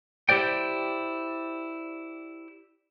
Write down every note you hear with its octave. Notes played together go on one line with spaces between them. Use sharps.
E4 G4 C5 D5 G5